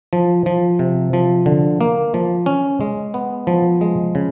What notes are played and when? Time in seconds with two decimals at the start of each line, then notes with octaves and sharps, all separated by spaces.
0.13 F3
0.46 F3
0.79 C3
1.13 F3
1.46 D3
1.81 A#3
2.14 F3
2.46 C#4
2.81 G#3
3.14 B3
3.47 F3
3.81 G#3
4.15 C#3